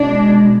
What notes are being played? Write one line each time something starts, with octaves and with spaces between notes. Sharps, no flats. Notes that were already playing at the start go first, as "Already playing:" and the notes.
Already playing: B2 G#3 D4